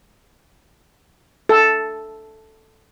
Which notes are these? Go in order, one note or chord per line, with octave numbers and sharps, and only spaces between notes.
A4